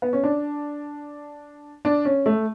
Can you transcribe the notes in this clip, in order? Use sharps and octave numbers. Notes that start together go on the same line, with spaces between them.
B3
C#4
D4
D4
C#4
A3